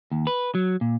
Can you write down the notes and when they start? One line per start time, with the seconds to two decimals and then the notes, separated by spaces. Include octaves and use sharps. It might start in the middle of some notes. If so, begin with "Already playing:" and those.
0.12 D#2
0.27 B4
0.55 F#3
0.81 A#2